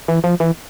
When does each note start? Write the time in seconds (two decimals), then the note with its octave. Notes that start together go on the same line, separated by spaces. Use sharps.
0.08 E3
0.24 F3
0.40 E3